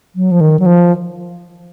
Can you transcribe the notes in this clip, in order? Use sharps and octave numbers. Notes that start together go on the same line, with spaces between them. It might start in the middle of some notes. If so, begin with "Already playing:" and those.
F#3
F3
D#3
F#3
F3